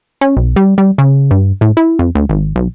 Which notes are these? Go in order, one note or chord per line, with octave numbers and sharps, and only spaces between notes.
C#4
B1
G3
G3
C#3
G2
A2
E4
F2
D2
G#1
B1